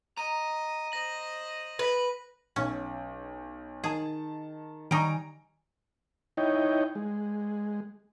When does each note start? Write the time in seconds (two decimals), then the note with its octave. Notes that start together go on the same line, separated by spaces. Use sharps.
0.17 D#5 A#5 D#7
0.92 C5 D#5 A#6 F#7
1.79 B4 B6 F#7
2.56 B1 C#4
3.84 D#3 G#4 A5
4.91 D#3 G3 D#4 G#5 A#5 C#6 D7
6.37 D#4 E4 C#5 D#5 G5
6.95 G#3